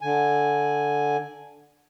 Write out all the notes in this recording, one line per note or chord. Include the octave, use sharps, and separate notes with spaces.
D3 G#5